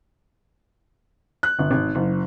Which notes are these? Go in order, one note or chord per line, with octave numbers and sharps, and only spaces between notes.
F#6
G1
G#1
F#1